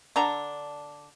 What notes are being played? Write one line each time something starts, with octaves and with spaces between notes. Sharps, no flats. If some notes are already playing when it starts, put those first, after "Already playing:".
D3 D4 A#5